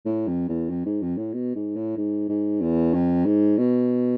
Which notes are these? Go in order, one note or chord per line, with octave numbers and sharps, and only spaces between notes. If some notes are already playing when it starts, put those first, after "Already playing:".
A2
F2
E2
F2
G#2
F2
A2
B2
G#2
A2
G#2
G#2
E2
F2
G#2
B2